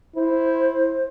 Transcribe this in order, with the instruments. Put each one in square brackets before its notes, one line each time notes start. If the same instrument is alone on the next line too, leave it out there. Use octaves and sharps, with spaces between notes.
[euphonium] E4 [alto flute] C5